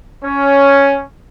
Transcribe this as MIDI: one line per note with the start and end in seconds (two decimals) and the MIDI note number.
0.24 1.02 61